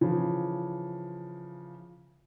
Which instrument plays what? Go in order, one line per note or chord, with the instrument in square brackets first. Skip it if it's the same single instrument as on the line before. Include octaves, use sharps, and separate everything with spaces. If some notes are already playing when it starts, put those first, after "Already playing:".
[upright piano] C#3 E3 F3